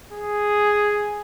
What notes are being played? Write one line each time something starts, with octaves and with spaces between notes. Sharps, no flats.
G#4